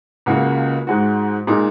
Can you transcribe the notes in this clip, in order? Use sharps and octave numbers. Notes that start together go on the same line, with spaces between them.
C#2 C#3 A#3 F#4
G#2 G#3 F#4
A#2 G#3 D#4 G#4